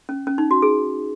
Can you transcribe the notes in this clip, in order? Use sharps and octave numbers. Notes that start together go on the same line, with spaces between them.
C#4
C#4
D#4
F#4
G#4